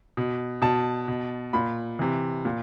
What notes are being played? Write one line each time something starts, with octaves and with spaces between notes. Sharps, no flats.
B2
B2 A5
B2
A#2 B5
C3 E3
A#2